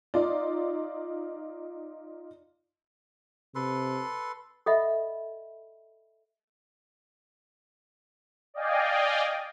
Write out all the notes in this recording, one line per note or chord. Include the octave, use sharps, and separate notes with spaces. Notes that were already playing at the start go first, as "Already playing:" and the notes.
D#4 F4 D5
C3 A4 B4 C6
A4 D#5 E5 F#5 B5
D5 D#5 F5 G5 G#5